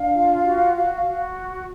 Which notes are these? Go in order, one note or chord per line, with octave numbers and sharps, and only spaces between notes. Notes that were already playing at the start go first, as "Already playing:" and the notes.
Already playing: D4 F5
F4
F#4
F#4
F#4